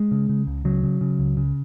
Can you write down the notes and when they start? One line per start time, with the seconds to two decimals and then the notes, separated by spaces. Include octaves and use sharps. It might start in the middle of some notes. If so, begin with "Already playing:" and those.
Already playing: G#3
0.11 C#3
0.29 C#3
0.47 C#2
0.65 C#3 F#3
0.83 C#3
1.01 C#3
1.19 C#2
1.37 C#3